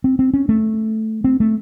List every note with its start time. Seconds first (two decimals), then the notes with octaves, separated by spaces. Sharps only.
0.04 C4
0.19 C4
0.34 C#4
0.49 A3
1.24 C4
1.40 A3